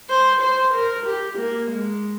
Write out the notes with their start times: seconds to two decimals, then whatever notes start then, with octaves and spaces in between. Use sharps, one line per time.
0.10 C5
0.42 C5
0.74 A#4
1.06 G4
1.39 A#3
1.71 G#3